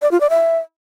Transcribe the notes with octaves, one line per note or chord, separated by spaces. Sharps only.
D5
F4
D5
E5